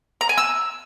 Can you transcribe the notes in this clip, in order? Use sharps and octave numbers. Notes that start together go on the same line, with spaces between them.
A#5
G#5
E6